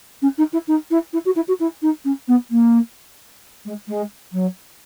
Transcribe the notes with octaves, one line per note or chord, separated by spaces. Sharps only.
C#4
D#4
E4
D#4
E4
E4
F#4
E4
F#4
E4
D#4
C#4
B3
A#3
G#3
G#3
F#3